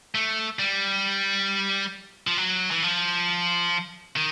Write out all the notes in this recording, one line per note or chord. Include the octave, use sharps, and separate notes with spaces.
A3
G3
F3
F#3
E3
F3
D#3